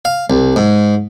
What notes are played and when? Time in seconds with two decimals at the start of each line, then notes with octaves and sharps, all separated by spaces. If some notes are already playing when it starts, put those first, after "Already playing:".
0.05 F5
0.30 C2
0.56 G#2